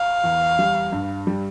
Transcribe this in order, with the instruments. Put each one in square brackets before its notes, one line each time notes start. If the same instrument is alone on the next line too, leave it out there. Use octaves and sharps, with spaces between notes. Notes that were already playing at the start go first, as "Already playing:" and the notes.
Already playing: [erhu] F5
[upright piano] E2
G3
G2
G3